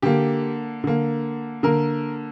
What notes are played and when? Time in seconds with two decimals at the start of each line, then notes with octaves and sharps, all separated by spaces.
0.02 D3 A#3 G4
0.84 D3 A#3
1.63 D3 A#3 A#4